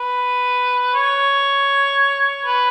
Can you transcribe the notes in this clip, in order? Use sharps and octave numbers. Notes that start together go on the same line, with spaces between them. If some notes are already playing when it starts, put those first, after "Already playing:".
Already playing: B4
C#5
B4